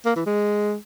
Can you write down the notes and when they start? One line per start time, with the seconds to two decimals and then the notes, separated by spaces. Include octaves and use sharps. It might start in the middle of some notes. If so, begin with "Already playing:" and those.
0.06 A#3
0.16 E3
0.26 G#3